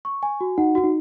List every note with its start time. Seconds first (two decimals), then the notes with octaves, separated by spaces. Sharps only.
0.05 C#6
0.23 G#5
0.41 F#4
0.58 D#4 F#5
0.75 F#4
0.84 D#4